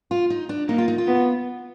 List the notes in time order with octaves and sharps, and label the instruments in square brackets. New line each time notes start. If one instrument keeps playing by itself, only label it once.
[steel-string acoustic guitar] F4
D#4
D4
[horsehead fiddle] A#3 [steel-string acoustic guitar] D#4
[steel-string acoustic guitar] F4
D#4
F4
[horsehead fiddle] B3